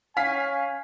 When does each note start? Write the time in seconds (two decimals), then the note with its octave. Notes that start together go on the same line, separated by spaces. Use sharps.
0.17 C#4 F5 G#5 B6